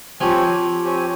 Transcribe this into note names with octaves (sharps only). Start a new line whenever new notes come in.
F3 C4 G4 C#5 G#5
C4 G4 C#5 G#5